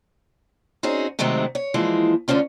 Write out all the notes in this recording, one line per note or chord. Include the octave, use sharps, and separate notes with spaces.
C4 C#4 D#4 F#4 G#4
C3 D#3 F#3 G#3 A3 C4
C#5
E3 F3 G#3 A#3
D2 G#2 D3 C#4 F4